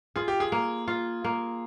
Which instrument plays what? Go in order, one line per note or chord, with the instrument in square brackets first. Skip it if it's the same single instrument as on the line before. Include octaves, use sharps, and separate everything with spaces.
[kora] F4 [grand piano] G#4
[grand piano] G4
G#4
[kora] A#3
F4
A#3